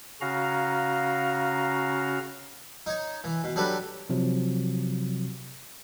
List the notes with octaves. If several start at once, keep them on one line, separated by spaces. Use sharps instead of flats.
C#3 C#4 F#4 F5 A#5
D#4 C#5
E3
B2
F#3 G3 D4 G4 A4 B4
C3 F3 F#3